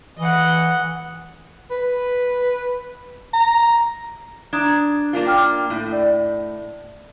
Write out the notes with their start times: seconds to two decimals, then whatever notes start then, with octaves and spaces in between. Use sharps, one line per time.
0.18 E3 D#5 F#5
1.71 B4
3.34 A#5
4.53 D4 A#5 D#6 G#6
5.13 A#3 D4 F4
5.27 G5 D6 F6
5.70 A2
5.92 D5